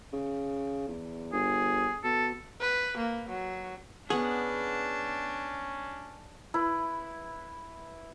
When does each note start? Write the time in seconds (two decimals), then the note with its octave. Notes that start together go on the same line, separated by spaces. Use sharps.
0.13 C#3
0.88 E2
1.33 G1 G#4
2.04 B2 A4
2.60 B4
2.97 A#3
3.29 F#3
4.10 B3 C#4 D4 G#4 F#5
6.54 E4 B4